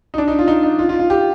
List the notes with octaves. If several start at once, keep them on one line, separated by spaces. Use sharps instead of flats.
D#4
D4
D#4
F4
D#4
D#4
F4
F4
F4
G4